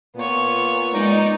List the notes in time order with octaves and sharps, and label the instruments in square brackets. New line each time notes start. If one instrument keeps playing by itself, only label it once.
[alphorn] A#2 [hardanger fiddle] B3 C#5
[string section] G#3 D#4 D5